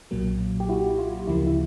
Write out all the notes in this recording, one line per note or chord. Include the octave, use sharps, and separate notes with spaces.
B1 A#2 F#3 A#3
G4
E4 F#4
F4
D2 C#3 F3 A#3 E4
E4